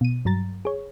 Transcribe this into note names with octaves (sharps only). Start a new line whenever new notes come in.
B2 D#7
G2 F#3 A#5 A6
G#4 C#5